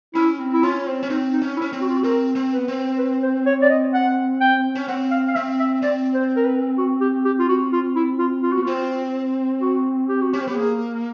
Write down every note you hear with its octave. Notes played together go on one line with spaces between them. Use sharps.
C#4 E4
C4
E4
C#4 F4
C4
C#4
C4 D#4
D#4
C#4
E4
C#4
C4
F#4
F4
F#4
C4 A#4
C4
B3 B4
C4
B4
C5
C#5
D5
D#5
F#5
G5
C#4
C4 F#5
F5
F5
C4 E5
E5
C4 D5
C5
A#4
B4
F#4
G4
G4
F4
F#4
F4
E4
F4
F4
B3 F#4
C4 F4
F#4
G4
F#4
C#4 G4
C4
B3 G4
A#3 G#4